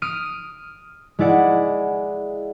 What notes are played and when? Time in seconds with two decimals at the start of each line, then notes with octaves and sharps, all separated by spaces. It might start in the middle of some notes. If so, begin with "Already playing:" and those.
0.02 D#6 F6 D7 D#7
1.19 G#3 E4 D5 F#5